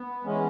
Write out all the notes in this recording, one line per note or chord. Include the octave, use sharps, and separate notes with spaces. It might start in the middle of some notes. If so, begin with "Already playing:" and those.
Already playing: B3
E3 G#3 C#4